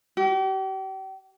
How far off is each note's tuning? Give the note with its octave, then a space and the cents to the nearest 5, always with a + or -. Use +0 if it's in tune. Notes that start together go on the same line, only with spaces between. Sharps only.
G4 -40